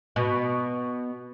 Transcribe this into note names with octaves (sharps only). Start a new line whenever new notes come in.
B2